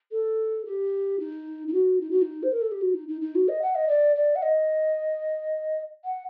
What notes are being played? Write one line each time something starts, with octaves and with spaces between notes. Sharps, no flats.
A4
G4
D#4
D#4
F#4
D#4
F#4
D#4
C5
A#4
A4
G4
F#4
D#4
D#4
D#4
F#4
D#5
F#5
D#5
D5
D5
F#5
D#5
F#5